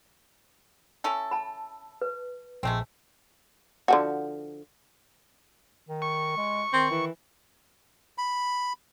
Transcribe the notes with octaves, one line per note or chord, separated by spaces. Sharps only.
C#4 E4 A4
A5 B5
B4
A#1 A#2 G#3 A3 C4
D3 F3 F#4
D#3
C#6
G#3
D#3 C4
E3
B5